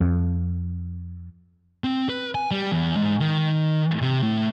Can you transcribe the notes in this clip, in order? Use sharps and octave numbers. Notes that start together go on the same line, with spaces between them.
F2
C4
B4
G#5
G3
E2
G#2
D#3
C3
A2